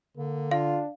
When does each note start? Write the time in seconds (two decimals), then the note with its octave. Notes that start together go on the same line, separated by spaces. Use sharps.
0.17 D3 A#3
0.51 D4 F4 F5